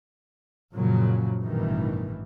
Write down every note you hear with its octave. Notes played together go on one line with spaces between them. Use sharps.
F#2 A#2 C#3 F3 F#3 G#3
A1 G2 B2 D#3 E3